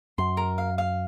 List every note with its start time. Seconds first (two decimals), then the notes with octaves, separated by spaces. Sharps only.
0.18 F#2 C6
0.37 A#4
0.58 F5
0.78 F5